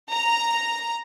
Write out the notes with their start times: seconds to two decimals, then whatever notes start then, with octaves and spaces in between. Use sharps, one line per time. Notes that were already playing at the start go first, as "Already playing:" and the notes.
0.12 A#5